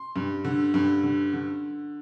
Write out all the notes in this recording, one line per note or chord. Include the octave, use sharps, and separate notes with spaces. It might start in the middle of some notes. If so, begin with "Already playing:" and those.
Already playing: C6
G2
D3
G2
D3
D3